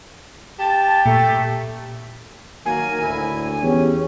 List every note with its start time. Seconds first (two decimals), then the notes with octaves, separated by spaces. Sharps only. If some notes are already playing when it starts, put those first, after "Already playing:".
0.59 G4 A5
1.06 A#2 A3
2.65 D#3 F#3 A#3 A#4 G#5
3.02 D2 A2 E4
3.62 E2 C#4 G4 G#4 C#5